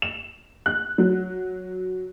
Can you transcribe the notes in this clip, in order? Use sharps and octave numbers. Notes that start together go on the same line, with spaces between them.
E7
F#6
F#3